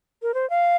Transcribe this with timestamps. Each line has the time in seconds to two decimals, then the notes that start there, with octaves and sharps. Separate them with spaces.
0.22 A#4
0.34 C5
0.50 F5